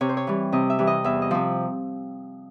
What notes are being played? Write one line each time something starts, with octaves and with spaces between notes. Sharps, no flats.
C3 C#5
C5
C#5
E3 G3
C3 D#5
E5
E3 G3
D#5
E2 E5
D#5
C3 F3